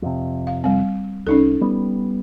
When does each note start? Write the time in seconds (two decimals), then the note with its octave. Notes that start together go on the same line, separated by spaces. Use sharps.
0.02 F2 C3
0.47 F5
0.64 G3 C4
1.27 C2 C#4 D#4 A4
1.61 G3 B3